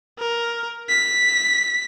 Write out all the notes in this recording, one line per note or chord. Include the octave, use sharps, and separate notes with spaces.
A#4
B6